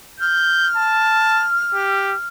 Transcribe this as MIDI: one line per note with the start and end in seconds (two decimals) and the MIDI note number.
0.20 2.27 89
0.20 0.69 91
0.76 1.48 81
1.74 2.15 67